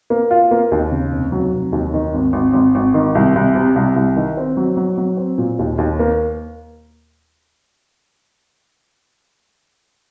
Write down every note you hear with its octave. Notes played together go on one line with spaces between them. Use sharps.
A#3
F4
A#3
D#2
C#3
F1
F#3
F1
D#2
D#3
G#1
G#1
G#1
G#1
D#3
C2
C2
C3
C2
C2
D#3
C4
F#3
F#3
F#3
C4
A#2
D#2
D#2
A#3